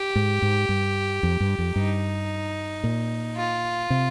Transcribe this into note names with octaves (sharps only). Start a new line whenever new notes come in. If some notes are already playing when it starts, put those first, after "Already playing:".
Already playing: G4
G#2
G#2
G2
F2
G2
F2
G2 D#4
A#2
F4
C3